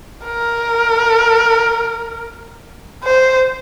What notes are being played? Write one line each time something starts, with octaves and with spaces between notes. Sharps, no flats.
A#4
C5